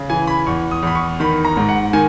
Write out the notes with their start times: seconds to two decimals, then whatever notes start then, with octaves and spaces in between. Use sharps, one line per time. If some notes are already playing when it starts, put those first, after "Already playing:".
Already playing: C#3
0.09 E3 G#5
0.27 B5
0.46 E2 C#6
0.71 D#6
0.83 E2 B5
0.95 C#6
1.20 D#3 B5
1.45 A#5
1.57 G#2
1.69 F#5
1.93 D#3 G#5